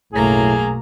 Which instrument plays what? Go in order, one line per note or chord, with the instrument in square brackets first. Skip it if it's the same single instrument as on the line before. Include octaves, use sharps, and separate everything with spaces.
[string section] B1 F#2 [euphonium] A2 [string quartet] A3 A#3 A#5 [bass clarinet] G#4